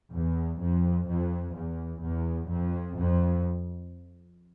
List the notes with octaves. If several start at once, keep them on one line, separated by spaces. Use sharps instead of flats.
E2
F2
F2
E2
E2
F2
F2